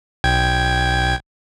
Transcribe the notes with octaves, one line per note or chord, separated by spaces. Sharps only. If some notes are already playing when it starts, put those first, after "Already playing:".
B1 G5 G#6